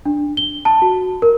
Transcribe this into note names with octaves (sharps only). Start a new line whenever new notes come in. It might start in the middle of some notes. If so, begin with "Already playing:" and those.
D4
G7
A5
F#4
A#4